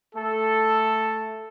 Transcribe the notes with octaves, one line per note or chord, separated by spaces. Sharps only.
A3 A4